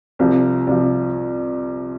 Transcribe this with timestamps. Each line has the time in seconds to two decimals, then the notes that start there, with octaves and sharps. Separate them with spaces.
0.19 C2 C3 F3
0.67 C2 C3 F3